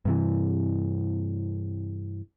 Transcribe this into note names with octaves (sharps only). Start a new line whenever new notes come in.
G2 C3 E3